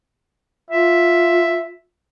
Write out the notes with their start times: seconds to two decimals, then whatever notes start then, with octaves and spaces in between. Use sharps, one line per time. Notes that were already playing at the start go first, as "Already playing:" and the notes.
0.70 F4 E5